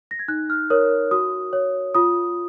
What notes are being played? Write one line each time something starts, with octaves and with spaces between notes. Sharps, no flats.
A#6
G#6
D#4 F#6
F6
A#4 C#5 D#6
F#4 D#6
C#5
F4 D#6